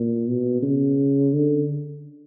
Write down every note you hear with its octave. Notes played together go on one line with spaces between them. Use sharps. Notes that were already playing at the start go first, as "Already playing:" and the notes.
Already playing: A#2
B2
C#3
D3